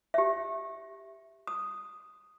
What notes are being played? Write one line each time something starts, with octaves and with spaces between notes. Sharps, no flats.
G4 E5
D#6